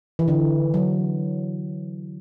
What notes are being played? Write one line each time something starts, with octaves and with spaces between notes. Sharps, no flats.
E3
D3
F#3